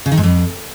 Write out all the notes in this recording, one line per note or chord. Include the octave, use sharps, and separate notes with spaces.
C#3
D#3
G#2
F2